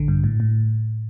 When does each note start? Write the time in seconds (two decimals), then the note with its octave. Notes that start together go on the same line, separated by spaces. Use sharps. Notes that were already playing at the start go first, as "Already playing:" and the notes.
Already playing: A#1 D3
0.08 G2
0.24 A2
0.40 A2